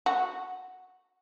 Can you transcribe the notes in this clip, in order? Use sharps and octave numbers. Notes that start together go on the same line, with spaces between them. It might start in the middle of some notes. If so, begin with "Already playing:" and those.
F#4